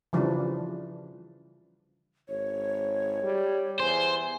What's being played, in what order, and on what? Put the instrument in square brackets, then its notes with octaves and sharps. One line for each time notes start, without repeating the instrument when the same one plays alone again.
[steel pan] C#3 E3 F3 G3 D4
[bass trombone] G#1 [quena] C#5
[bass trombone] G3
[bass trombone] E2 [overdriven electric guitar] C5 [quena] G#5